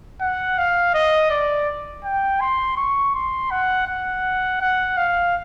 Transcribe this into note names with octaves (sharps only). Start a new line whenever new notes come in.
F#5
F5
D#5
D5
G5
C6
C#6
C6
F#5
F#5
F#5
F5